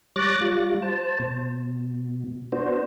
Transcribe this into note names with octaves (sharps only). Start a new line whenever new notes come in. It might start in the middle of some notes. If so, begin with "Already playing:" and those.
G3 C#5 D6 F#6 A6 A#6
G3 F4
C5 A5
B2
B3 D4 F#4 C5